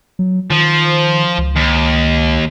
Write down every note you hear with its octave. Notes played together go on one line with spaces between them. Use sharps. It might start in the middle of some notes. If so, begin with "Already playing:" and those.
F#3
D#3 F3
C#2
D#2